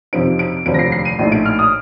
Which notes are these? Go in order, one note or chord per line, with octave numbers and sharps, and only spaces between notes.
F2 C3 F3 C4 D#4 D7
D7
F1 D#2 D3 F3 C4 D7
A#6
C7
C7
D#7
A#1 A2 A3 D#4
D7
F6
D#6